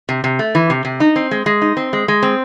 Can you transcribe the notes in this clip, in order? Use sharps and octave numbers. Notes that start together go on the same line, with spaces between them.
C3
C3
A3
E3
C3
C3
D#4
C4
G#3
G#3
D#4
C4
G#3
G#3
C4